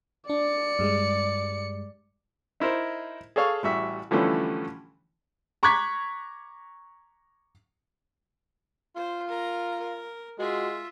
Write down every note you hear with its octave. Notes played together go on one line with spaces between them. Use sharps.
D4 D5 C#7
G2 G3 G#3
D#4 E4 A#4 C5
G#4 A4 C#5 F5
A1 G3 F#4 E5
D3 E3 F3 G3 A3 C#4
A#5 C#6 D6 F#6 G#6 B6
F4 C5
A#4 A#5
A#4
G#3 F4 F#4 E5